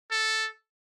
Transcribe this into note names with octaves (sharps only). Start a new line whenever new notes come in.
A4